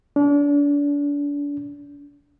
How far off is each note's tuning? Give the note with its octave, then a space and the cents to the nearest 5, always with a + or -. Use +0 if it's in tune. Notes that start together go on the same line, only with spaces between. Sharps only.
D4 -35